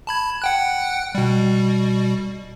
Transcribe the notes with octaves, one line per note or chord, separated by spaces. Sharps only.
A5 B5 G#6
F#5 G5 F#6
B2 G3